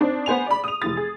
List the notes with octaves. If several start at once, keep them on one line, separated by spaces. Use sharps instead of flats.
C4 D4 D#4
B3 C5 G#5 F7
D5 B5
D#6 F7
F1 E3 A6
G#4